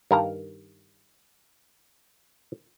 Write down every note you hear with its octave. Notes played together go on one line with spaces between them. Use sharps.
G2 D#3 A#4 F5 A5 A#5